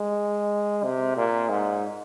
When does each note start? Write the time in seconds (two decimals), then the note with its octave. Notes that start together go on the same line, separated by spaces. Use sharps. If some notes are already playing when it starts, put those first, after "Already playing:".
Already playing: G#3
0.84 C3
1.17 A#2
1.49 G#2